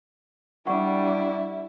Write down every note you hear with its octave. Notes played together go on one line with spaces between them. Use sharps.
G3 D4 E4 F#5 C#6